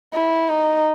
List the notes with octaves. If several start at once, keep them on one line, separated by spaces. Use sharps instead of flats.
E4
D#4